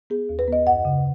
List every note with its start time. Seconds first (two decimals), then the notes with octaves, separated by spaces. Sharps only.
0.10 B3 G#4
0.29 D#2
0.39 B4
0.48 B3 D#5
0.67 F#2 F#5
0.85 C#3